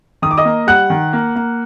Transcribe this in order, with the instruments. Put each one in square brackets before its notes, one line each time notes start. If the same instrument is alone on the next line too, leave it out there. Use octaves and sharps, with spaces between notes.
[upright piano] D#3 D#6
D6
D#5 D#6
A#3
G3 F#5 F#6
D#3
A#3
A#3